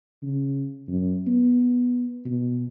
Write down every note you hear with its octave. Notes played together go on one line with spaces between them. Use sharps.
C#3
F#2
B3
B2